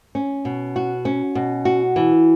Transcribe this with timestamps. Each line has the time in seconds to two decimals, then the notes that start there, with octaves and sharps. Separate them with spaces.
0.15 C#4
0.45 B2
0.76 F#4
1.05 C#4
1.35 B2
1.65 F#4
1.96 E3